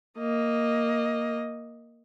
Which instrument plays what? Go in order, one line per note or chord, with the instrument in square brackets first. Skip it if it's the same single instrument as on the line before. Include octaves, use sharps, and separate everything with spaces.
[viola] A#3 D#5